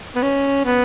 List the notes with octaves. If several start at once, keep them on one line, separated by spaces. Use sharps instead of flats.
B3
C#4
B3